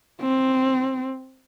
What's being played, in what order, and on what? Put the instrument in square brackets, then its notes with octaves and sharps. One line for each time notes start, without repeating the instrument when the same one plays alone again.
[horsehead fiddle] C4